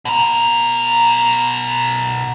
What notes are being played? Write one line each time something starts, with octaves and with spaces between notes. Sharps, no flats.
B2 A#4